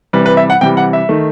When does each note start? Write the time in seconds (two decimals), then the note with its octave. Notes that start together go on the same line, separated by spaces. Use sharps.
0.13 C3 E3 G3 B4
0.26 B4
0.37 E5
0.50 F#5
0.61 C3 E3 G3 G5
0.77 F#5
0.93 E5
1.09 D#3 A3